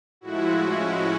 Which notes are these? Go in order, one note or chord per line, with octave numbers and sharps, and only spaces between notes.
A2 F3 G#3 E4 F#4
C#4